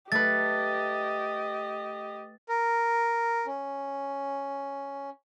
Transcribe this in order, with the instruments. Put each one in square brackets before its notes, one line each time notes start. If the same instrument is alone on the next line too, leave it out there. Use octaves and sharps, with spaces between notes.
[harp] A3 B4 [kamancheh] G4 D#5 [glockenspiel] A6
[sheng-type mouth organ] A#4
C#4